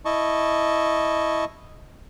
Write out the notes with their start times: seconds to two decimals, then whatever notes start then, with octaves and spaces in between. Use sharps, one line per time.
0.05 E4 D#5 A5 C#6